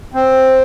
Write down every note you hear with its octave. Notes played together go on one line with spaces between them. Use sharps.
C4